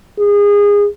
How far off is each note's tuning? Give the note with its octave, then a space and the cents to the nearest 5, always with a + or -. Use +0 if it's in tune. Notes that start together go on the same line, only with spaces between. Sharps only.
G#4 -25